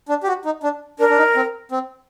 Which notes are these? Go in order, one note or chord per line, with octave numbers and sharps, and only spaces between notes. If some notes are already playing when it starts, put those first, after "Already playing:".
D4
G4
F#4
D#4
D4
D4 A#4
D4
D#4
C4
C4